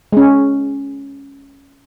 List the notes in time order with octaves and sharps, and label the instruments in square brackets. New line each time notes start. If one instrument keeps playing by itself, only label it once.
[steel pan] G#3 C#4